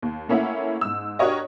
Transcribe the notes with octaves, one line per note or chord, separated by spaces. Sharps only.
D#2
A3 A#3 C#4 E4 E5 F#5
G#2 E6
D4 F#4 G4 A#4 C#5 D#5